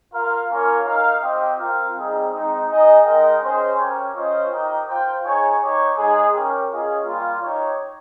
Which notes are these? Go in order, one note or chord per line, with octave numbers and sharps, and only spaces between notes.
F4 A#4 F5
A#3 C#4 F4 A#4 C#5
D#4 A#4 F5
C4 G4 C5 D#5 G5
C4 F4 A#4 F5
G3 C4 D#4 G#4 D#5
G#3 C4 D#4
D#4 G#4 D#5
G#3 D#4 A#4 D#5 G5
C#4 G#4 C5 D#5
C#4 G4 A#4 C#5
C#4 F4 C5 D#5
D#4 G4 A#4 D#5 G5
F4 C5 G5
D#4 G#4 C#5
D#4 G4 C#5
G#3 D#4 G#4
C#4 G4 A#4
C#4 F4 G#4 D#5
G3 A#3 F4
D#4 G4 C#5